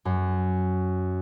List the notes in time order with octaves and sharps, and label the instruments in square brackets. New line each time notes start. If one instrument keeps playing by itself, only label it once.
[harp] F#2